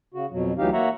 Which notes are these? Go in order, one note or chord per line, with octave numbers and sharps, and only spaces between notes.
C#3 F#4
F2 B2 F#3
D2 E3 F#3 D#4 G4 F5
A#3 F#4 C#5 E5 F#5 A#5